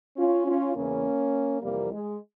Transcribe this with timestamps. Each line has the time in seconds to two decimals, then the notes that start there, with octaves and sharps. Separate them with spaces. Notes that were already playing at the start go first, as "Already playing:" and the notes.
0.17 C#4 F4
0.46 C#4 F4
0.75 E2 C#3 E3 A#3 C#4
1.62 F2 C3 E3 G3 A#3
1.92 G#3